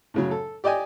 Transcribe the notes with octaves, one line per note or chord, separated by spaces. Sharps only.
A2 C#3 F#3
A4
G4 D5 D#5 G5 G#5